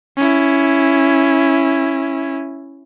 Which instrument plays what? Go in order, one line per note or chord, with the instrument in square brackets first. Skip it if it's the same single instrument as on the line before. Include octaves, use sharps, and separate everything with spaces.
[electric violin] C#4 E4